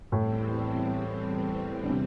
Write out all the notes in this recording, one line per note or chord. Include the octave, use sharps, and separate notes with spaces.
E2 A2 E3 G3 C4
D3
C3